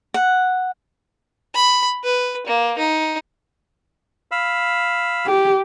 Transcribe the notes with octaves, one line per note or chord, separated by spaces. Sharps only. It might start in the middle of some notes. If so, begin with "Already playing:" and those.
F#5
B5
B4
A#3
D#4
F5 B5 E6
G4